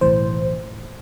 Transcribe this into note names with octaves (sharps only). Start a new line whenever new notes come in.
B1 A2 E3 C5